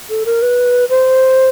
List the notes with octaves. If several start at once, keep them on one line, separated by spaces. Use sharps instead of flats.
A4
A#4
B4
C5